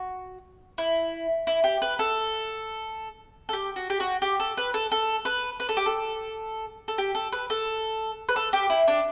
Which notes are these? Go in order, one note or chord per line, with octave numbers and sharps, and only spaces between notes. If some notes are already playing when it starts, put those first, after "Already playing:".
Already playing: F#4
E4
E4
G4
B4
A4
A4
G4
F#4
G4
F#4
G4
A4
B4
A4
A4
B4
B4
A4
G4
A4
A4
G4
A4
B4
A4
B4
A4
G4
E4
D4